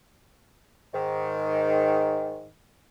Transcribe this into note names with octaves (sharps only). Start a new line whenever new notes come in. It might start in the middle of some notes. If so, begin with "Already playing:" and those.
G#2 D#3